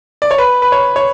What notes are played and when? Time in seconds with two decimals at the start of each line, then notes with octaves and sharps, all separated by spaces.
0.22 D5
0.31 C#5
0.38 B4
0.62 B4
0.72 C#5
0.96 C#5